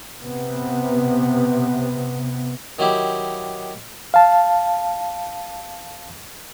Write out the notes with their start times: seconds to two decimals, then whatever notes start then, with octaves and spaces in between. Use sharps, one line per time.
0.22 C3 B3
2.79 D#3 F#3 E4 G4
4.14 F5 A5